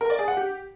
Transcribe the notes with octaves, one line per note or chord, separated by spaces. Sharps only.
A#4
D5
G#4
F#5
G4